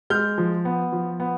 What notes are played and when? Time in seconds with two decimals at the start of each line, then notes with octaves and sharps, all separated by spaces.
0.10 G#3 F6 G6
0.38 F3
0.65 B3
0.92 F3
1.20 B3